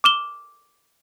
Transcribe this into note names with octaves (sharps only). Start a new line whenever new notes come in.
D6 F6 E7 G7